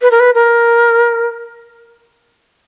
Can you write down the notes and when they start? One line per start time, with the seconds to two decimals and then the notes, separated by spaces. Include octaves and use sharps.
0.02 B4
0.11 A#4
0.20 B4
0.35 A#4